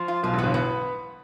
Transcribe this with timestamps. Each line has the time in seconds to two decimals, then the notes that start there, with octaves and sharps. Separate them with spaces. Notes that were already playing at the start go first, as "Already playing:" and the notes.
Already playing: F3
0.08 F4
0.23 B1 B2 F4
0.34 A1 A2
0.38 B3
0.44 G1 G2
0.54 B3